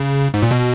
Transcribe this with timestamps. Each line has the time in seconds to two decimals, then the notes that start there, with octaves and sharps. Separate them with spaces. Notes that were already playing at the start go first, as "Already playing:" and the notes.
Already playing: C#3
0.34 G#2
0.42 A#2
0.51 B2